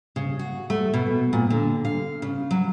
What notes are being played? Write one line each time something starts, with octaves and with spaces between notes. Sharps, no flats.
C#3
F#4
A3
B2
A#2
D3
F5
C#3
F#3